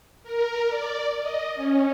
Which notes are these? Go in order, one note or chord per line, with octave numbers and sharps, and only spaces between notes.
A#4
D5
D#5
C#4